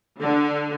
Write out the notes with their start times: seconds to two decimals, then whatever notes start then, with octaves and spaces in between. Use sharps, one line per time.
0.21 D3